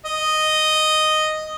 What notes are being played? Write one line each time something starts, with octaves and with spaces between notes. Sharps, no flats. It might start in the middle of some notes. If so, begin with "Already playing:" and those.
D#5